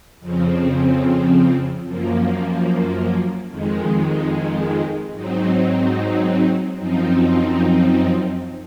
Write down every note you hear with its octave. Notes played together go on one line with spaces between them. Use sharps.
F2 C#3 F3 C4
F#2 F3 A#3
F2 D#3 G#3
G#2 F#3 C4 D#4
F#2 F3 C4 D#4